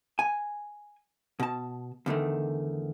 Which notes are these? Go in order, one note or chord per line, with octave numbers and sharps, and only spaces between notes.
G#5
B2 A5
E2 D3 D#3 A3